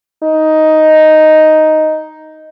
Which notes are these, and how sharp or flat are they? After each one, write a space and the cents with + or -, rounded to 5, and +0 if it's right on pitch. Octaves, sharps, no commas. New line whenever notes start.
D#4 +5